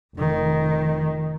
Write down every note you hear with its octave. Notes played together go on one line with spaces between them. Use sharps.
F1 D#3